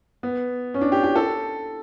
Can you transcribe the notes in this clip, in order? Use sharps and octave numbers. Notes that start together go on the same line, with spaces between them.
B3
C#4
D4
G4
G4
A4